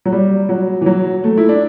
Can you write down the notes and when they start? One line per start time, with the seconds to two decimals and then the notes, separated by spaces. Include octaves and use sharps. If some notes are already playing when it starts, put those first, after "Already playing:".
0.05 F#3
0.12 G3
0.49 F#3
0.81 E3
0.86 F#3
1.24 A3
1.38 E4
1.49 D4